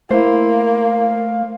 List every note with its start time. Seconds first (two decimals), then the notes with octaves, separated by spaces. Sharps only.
0.11 A3 A#3 E4 C5
0.83 F5